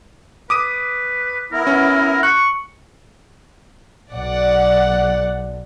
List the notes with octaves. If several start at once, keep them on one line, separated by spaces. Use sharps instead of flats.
B4 D6 D#6 D#7
B3 E4 A#4
C#4
C#6 F#6
B1 D5 F#5